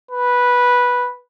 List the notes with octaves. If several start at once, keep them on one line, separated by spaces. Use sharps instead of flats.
B4